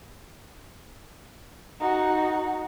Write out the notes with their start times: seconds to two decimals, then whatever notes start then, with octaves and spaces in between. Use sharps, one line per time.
1.81 D#4 F#4